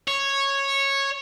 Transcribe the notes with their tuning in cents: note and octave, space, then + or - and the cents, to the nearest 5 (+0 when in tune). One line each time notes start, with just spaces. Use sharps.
C#5 -10